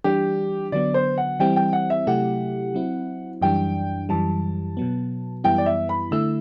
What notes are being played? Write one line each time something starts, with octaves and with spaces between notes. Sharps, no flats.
E3 G3 D4 G4
D3 F#3 B3 D5
C5
F#5
E3 G3 C4 E4 G5
G5
F#5
E5
C3 F#3 A3 E4 G4 F#5
F#3 C4 E4
F#2 E3 G3 D4 G5
F#2 E3 G3 A5
B2 F#3 B3
F#2 E3 G3 B3 E4 G5
D5
E5
B5
D3 A3 E4 E6